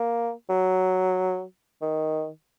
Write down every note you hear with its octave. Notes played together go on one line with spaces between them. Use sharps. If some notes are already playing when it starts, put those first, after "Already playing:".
Already playing: A#3
F#3
D#3